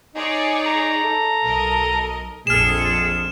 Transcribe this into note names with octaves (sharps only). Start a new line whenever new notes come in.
D#4 G#4 C#5 D5
A#5
A4
B1 A#4 D#5
A#1 F2 G#4 A4 F6 E7